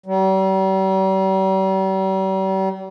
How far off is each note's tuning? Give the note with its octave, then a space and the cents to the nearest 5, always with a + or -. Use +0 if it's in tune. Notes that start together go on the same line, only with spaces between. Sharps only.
G3 -40